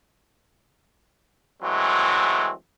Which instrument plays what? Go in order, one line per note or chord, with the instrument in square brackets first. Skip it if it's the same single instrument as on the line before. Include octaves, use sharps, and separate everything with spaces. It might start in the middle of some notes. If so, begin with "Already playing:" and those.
[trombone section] E3 F#3 G#3 A3 C4